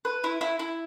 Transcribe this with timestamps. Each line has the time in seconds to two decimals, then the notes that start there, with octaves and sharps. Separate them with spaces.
0.05 B4
0.24 E4
0.41 E4
0.59 E4